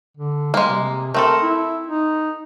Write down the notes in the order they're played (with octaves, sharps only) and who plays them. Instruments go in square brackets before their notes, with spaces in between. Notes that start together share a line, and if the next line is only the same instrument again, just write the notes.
[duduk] D3
[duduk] G3 [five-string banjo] G#3 A#3
[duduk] C3
[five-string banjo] A3 C4 A4 [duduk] A#4
[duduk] E4
D#4